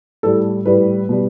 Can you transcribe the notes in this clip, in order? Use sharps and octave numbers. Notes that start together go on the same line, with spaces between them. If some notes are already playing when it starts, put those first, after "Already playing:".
A2 G3 A4
A2 G3 B4
B2 G3